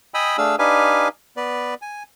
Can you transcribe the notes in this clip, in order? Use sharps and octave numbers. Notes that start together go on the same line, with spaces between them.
D#5 G5 G#5 B5 D#6 E6
A3 D4 G#4 F5 E6
D4 D#4 G4 B4 F5 G#5
B3 B4 D5
G#5